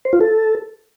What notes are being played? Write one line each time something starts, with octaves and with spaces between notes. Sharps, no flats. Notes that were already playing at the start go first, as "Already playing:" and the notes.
C5
F4
A4